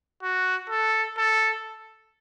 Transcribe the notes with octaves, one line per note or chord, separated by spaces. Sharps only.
F#4
A4
A4